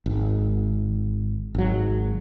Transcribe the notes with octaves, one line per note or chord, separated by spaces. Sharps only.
G#1
G#1 F#3